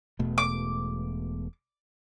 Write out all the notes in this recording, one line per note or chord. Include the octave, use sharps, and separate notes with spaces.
E1 B2 A3
D6